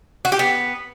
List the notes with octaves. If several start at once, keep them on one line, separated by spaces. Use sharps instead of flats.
F#4
G4
B3